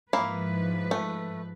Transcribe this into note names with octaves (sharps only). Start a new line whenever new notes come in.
G#2 F3 A#3 E4 B4 F5
A3